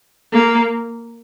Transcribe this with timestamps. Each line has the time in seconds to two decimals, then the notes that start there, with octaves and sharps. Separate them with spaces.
0.33 A#3